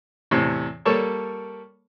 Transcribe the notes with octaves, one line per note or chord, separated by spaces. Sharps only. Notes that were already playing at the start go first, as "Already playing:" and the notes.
E2 A2 C3
G3 A#3 A4 C#5 A5 C#6